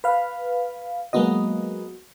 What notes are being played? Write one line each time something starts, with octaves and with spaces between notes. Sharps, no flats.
B4 F5
F#3 G#3 A#3 B3 F#4 D#5